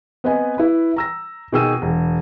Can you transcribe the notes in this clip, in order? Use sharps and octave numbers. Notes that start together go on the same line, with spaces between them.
B3 C4 B4 D#5 G#5
E4 B4
A#5 E6 A#6
B2 D#3 G#4 G5 E6 D#7
E1